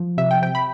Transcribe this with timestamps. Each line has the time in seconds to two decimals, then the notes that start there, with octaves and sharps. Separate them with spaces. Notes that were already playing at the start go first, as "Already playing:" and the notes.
Already playing: F3
0.18 C3 E5
0.31 G5
0.42 C3 G5
0.55 B5